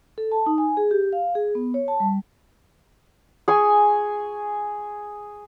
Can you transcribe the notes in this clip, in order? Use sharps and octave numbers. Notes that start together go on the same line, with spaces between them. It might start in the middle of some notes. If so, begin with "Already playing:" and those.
A4
A5
D#4
G#5
G#4
G4
F5
G#4
B3
C#5
A5
G3
G#4 G#5 C#6